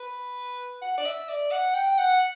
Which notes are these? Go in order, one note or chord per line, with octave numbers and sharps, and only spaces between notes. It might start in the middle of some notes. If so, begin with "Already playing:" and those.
Already playing: B4
F#5
D5
E5
D5
F#5
G5
F#5